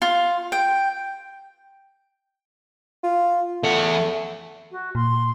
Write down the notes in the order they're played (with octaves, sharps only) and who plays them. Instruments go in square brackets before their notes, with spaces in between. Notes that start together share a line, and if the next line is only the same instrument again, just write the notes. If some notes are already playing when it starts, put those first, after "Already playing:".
[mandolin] F4
G5
[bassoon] F4
[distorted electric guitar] E2 F#5 [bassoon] A3
[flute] F#4
[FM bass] A#2 [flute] C6